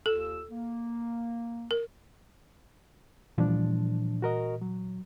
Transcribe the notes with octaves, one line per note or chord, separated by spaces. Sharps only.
D#2 F4 A4 E6
A#3
A#4
A#2 E3 F3 G3 D4
F#4 A#4 D#5
F#3